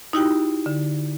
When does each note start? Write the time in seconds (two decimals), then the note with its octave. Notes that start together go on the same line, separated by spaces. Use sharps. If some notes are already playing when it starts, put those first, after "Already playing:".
0.13 D#4 E4 F#4 G4 G5
0.66 D3